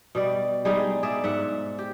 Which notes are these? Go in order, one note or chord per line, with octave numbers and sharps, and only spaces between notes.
B2 G3 D5
G3 G#3 D#4 G#4
G#4 D5 E5
G#2 E5 F#5
G4